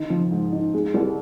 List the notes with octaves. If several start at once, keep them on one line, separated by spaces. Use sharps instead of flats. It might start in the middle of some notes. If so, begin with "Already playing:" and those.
Already playing: D#3 D#4
F3
G#2
D#4
G#3
C2